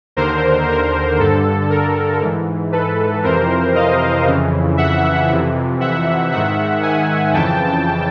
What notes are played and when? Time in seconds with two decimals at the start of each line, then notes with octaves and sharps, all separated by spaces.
0.16 D#2 D3 A#4 C5
0.68 A#4
1.19 G2 D3 A4
1.70 A#4
2.21 G#2 E3
2.72 A4 B4
3.24 F2 C3 E3 A#4 C5
3.75 D#5 F5
4.26 F2 C#3 E3
4.77 E5 F#5
5.29 F2 C3 E3
5.81 E5 F#5
6.32 G#2 D#3 E5 F#5
6.83 F#5 G#5
7.34 F2 C#3 E3 G5 A5